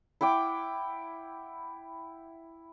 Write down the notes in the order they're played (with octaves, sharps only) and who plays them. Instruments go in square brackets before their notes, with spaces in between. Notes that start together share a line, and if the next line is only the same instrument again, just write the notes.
[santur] E4 F#5 G5 D6